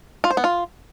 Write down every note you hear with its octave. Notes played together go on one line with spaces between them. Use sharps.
F4
C5
B3
F4